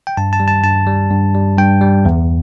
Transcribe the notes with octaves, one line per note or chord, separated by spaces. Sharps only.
G5
G2 A5
A5
G3
A5
G2 A5
G3
G2
G3
G2 G5
G3
E2